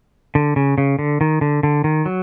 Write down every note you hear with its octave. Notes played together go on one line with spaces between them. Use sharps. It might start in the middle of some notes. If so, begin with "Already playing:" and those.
D3
C#3
C#3
D3
D#3
D3
D3
D#3
F#3